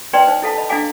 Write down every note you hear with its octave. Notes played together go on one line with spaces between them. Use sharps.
D#4 B4 D5 D#5 G5 C6
D#4 C5
E4 A4 F5 A5
D#5 B5
D4 E4 A4 F5 G#5 D6